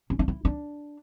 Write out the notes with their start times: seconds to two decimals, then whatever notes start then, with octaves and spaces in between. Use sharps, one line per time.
0.10 C#4
0.19 D4
0.28 E4
0.45 D4